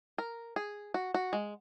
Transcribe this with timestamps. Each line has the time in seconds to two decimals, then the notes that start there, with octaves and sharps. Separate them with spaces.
0.18 A#4
0.56 G#4
0.94 F#4
1.14 F#4
1.33 G#3